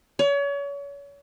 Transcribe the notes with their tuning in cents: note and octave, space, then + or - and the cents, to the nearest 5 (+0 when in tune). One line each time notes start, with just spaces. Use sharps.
C#5 +35